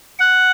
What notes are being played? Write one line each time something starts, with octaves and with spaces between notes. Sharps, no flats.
F#5